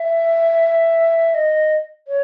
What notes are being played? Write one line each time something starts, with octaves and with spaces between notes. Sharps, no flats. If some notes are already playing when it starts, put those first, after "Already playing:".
Already playing: E5
D#5
C#5